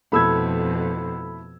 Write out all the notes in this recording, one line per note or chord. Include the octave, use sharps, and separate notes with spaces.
F2 B2 A3 E4 B5 E6 G#6